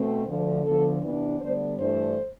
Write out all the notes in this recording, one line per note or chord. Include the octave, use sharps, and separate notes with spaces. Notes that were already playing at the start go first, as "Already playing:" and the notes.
Already playing: B2 A3 C4
D2 D3 F3
D2 D3 F3 B3 A4
C3 E3 B3 D4
D2 D3 G3 B3 D4 C5
G2 E3 A3 D4 C5